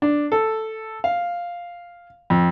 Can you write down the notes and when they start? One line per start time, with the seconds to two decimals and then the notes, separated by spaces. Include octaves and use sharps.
0.02 D4
0.32 A4
1.04 F5
2.30 F2